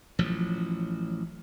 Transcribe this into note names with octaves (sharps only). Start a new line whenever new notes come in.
A1 F3 F#3